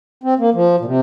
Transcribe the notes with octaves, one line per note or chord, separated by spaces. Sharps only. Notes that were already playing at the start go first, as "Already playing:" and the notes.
C4
A#3
F3
A#2
C3